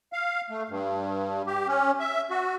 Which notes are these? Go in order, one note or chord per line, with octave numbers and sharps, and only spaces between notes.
F5
A3
G2
G4
C#4
E5
F#4